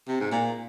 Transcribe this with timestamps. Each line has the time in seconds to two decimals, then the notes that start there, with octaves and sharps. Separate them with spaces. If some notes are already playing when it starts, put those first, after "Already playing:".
0.08 C3
0.20 G#2
0.32 A#2